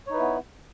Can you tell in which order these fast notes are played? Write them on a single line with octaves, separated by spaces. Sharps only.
C#5 D#4 B4 E4 B3